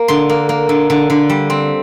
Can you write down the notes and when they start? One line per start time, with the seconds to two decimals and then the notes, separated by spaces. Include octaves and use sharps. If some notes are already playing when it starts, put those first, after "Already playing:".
Already playing: A#3
0.08 D3 C6
0.29 A#3
0.49 A#3
0.69 D3
0.90 D3
1.10 D3
1.30 G3
1.50 C4